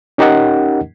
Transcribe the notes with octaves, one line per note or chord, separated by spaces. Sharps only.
C#4 D#4 G4 A#4 D#5 F#5